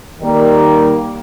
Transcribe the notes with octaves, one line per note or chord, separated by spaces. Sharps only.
D#3 G3 A#3